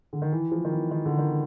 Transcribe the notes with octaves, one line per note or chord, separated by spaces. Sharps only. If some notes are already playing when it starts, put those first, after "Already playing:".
D3
D#3
E3
F3
D#3
E3
D#3
D3
D#3